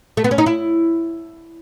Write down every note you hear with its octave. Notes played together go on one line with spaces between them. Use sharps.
A3
B3
C#4
D#4
E4